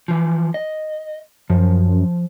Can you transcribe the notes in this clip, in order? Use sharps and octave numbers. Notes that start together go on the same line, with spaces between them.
E3 F3
D#5
F#2 F3